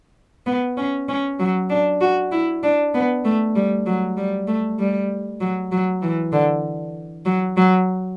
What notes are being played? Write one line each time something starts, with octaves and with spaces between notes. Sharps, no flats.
B3
C#4
C#4
F#3
D4
F#4
E4
D4
B3
A3
G3
F#3
G3
A3
G3
F#3
F#3
E3
D3
F#3
F#3